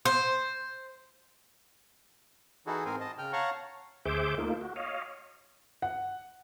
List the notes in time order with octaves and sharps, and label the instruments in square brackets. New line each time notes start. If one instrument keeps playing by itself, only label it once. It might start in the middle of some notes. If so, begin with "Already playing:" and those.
[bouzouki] C5
[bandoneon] E3 D#4 E4 F#4 G#4 A4
G#2 C4 A#4 C5 G#5
D#5 A5
C#3 G5 F6
C#5 F5 F#5 A5 A#5 C#6
[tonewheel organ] D2 G#4 C5 E5 D6 G6
A3 A#3 D#4 F4
F#4
C#5 D#5 F5
[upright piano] F#5